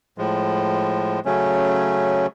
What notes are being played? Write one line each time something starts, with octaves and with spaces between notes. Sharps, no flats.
A2 F3 G#3
C#3 F#3 A3 C#4